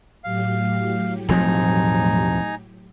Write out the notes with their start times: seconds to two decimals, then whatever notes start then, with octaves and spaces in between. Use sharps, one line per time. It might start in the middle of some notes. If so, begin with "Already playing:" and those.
0.24 A2 F#3 G4 F5
1.29 E1 F3 C4 D#4 G#5 A#5